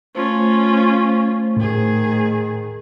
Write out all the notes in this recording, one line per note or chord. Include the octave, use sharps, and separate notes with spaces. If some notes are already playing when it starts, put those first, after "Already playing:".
A3 C#4 F4 C5
A2 D#3 G#4